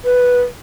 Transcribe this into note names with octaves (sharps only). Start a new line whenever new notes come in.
B4